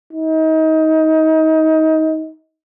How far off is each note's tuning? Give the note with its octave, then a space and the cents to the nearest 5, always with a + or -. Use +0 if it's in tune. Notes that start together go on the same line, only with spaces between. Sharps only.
D#4 +25